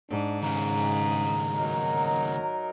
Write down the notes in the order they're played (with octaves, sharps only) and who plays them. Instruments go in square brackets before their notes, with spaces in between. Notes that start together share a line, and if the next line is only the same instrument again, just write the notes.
[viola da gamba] G#2 [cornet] D4
[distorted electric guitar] D#2 C#3 [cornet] A#5
[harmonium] F#3 D#4 A#4